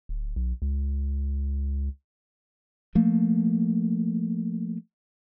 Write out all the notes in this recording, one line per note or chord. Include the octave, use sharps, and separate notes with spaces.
D1
B1
C#2
F3 A3 A#3